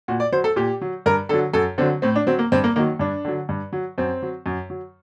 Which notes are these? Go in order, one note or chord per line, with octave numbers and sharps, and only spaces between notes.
A#2 F#4
D5
F#3 C5
A4
A#2 G4
F#3
G2 A#4
D3 F#3 A4
F#2 A4
D3 F#3 C4
A2 C4
D4
F#3 C4
A#3
G2 C4
A#3
D#3 F#3 A#3
G2 D4
D3 F#3
G2
F#3
F#2 C4
F#3
F#2
F#3